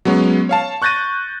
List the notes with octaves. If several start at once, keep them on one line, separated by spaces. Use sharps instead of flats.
F#3 G#3 B3 C#4
C#5 F5 A5
C#6 F#6 G6 A6 A#6 D#7